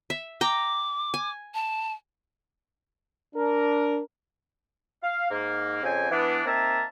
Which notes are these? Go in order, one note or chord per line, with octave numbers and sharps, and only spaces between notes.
E5
G5 A#5 D6
G#5
A5
D4 A#4
F5
G#2 A#3
F2 C#3 C4 G5 G#5
E3 B3 D4
A#3 C4 D#4 E5 A5 A#5